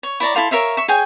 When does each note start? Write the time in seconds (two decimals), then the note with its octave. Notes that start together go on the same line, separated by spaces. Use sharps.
0.03 C#5
0.20 E4 C#5 D5 A#5
0.35 E4 A4 F5 C6
0.51 A#4 C#5 E5 F5
0.77 E5 C#6
0.88 G#4 C#5 G5 G#5